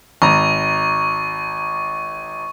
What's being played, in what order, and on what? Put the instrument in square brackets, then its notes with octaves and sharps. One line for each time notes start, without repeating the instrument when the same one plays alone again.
[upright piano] G#1 A#5 [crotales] C#6